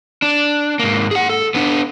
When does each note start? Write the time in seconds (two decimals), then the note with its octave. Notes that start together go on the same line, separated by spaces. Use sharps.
0.22 D4
0.79 G#2 A#3
1.11 G#4 F#5
1.29 A4
1.55 B3 D4